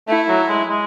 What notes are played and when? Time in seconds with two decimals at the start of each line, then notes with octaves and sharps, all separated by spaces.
0.08 A3 E4
0.29 F#3
0.49 G#3
0.69 G#3